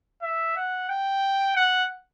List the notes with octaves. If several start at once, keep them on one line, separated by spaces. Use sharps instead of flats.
E5
F#5
G5
F#5